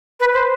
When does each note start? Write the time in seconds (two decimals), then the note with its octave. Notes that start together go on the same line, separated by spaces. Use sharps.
0.20 B4
0.33 C5